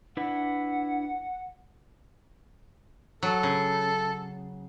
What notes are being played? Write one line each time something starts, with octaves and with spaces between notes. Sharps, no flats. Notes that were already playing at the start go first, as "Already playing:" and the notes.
D4 E4 B4 F#5
F#3 A4
C#3